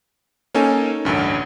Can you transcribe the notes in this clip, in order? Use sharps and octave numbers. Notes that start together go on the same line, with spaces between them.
A#3 C#4 D#4 A4 C#5 G#5
A1 D2 G2